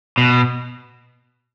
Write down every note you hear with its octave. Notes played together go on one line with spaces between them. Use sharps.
B2